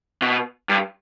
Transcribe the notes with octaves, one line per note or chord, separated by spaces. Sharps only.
B2
G2